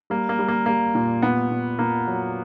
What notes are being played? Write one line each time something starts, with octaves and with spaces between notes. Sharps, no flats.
G3 A#3
A#3
G3
A#3
G3 A#3
A#2
A#2 B3
A#2
A#2 A#3
F#3